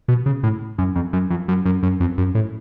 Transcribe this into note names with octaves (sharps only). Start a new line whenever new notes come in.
B2
C#3
A2
F#2
F2
F#2
F2
F#2
F#2
F#2
F2
F#2
A2